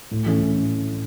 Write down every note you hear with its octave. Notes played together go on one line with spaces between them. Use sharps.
A2
E3 A3 C#4
A2